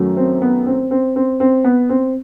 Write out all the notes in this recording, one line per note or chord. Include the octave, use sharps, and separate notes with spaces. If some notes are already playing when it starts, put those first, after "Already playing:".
Already playing: F#2 D#3 F#3 A3
C4
B3
C4
C4
C4
C4
B3
C4